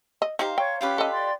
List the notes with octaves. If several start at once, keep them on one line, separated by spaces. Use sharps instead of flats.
D#5
D#4 G4 C5 F5 A#5
C#5 G5 C#6
C#4 F4 G4 B4
A4 D#5
D5 C6